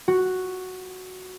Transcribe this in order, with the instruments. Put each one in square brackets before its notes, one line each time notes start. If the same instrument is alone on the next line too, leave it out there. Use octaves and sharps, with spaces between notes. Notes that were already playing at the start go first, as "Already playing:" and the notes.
[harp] F#4